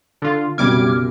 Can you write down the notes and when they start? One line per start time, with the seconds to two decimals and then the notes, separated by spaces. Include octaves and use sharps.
0.22 D3 F4
0.58 F#1 C2 B2 G3 D6 F6 G#6